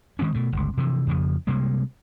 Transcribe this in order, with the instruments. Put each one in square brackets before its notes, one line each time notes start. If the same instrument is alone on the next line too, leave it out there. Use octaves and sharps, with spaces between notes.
[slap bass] D#3 G#3 C4 C#4
B2 A3
G1 C#2
C3 E3 F3
F2 C#3 F3
C3 G3 G#3 A#3